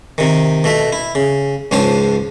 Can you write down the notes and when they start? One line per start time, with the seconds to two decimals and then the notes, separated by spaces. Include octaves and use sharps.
0.18 C3 D#3
0.64 B2 A3 E5
0.93 E4
1.15 C#3
1.71 C#2 G#2 F3 C5 C#5 A5